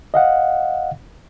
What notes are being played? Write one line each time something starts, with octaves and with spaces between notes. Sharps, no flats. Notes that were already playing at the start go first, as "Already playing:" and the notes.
D#5 F5 F#5